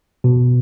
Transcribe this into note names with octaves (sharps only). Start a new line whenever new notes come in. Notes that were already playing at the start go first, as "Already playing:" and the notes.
B2